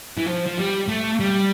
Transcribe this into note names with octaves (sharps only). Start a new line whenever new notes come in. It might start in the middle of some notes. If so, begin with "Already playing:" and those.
E3
F3
F3
G3
A3
G3